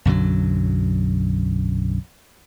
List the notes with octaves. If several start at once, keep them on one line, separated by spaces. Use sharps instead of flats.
B1 F#2 D3 F#3